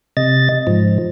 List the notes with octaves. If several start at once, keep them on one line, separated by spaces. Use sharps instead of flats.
C3 D#5 A6
G#2 F3